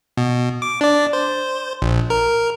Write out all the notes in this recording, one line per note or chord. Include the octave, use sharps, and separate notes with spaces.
B2
D6
D4 D5
C5
A#1
A#4